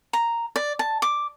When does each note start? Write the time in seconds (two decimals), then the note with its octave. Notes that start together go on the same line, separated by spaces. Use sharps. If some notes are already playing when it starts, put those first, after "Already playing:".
0.13 A#5
0.56 D5
0.79 A5
1.02 D6